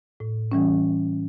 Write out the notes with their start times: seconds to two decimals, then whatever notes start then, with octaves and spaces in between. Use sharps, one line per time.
0.20 A2
0.52 E3 G3 C#4